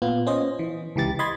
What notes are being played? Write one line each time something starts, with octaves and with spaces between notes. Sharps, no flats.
A#2 B3 F4
C#4 C5 D#5
E3
C#2 E3 G4 A6
D#5 B5 C6 G#6 A6